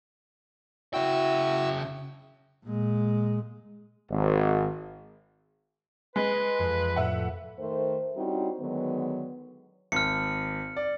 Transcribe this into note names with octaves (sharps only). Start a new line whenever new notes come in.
C#3 E4 F#4 G5 E6
A#2 G#3
G#1
G#3 B4
F2
A2 E5 F#5
D#3 A3 A#4 C5
G3 C4 C#4 D#4 E4 F#4
D3 D#3 F#3 G#3 B3
G#1 F6 C#7
D5